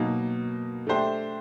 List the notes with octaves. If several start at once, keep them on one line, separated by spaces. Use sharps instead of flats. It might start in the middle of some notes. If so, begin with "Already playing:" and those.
Already playing: B2 F#3 A#3 D#4
A3 D4 G4 C5 E5